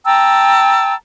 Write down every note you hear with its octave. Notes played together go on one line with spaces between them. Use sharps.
G5 A5 A#5 E6